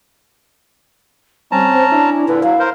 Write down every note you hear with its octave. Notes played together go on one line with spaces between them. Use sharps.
G3 C4 C#4 A5 A#5
C5
D4 E4
A#2 D3 B4
F#3 F5
A#4 C5